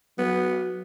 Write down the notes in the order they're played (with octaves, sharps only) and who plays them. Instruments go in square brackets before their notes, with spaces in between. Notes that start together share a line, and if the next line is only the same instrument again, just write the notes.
[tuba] F#3 [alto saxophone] B3